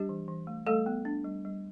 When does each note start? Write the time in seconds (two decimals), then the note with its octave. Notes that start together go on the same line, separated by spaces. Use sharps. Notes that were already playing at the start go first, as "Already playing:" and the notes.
Already playing: G3 D4 G4
0.09 E3
0.28 E3
0.47 A3
0.66 G3 A3 A4
0.86 B3
1.05 D4
1.24 G3
1.45 G3